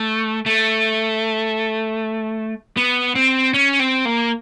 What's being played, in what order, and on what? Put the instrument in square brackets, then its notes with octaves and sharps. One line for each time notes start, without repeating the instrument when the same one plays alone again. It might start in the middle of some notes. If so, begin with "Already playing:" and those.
Already playing: [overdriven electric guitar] A3
A3
B3
C4
C#4
C4
A#3